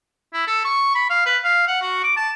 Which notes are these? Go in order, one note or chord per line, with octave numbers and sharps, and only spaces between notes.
E4
A4
C#6
B5
F5
B4
F5
F#5
F#4
D6
A5